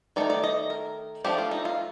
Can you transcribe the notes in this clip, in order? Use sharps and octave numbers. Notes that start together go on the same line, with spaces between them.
D#3 A3 D#4 D5
D5
D#5
A#4
F3 A3 D4 G4
F4
D#4
F4